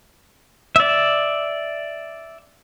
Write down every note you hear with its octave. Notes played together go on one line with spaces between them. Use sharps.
D5 E5